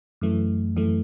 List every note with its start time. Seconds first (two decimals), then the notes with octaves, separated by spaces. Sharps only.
0.21 F#2 E3 A3
0.76 F#2 E3 A3